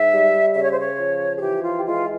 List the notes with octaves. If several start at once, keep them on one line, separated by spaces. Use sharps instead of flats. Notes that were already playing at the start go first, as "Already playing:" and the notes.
Already playing: G#2 E5
G3
C#3 E5
C#5
C5
C#5
F3
G#4
E3 G4
F4
G4
G#3 F4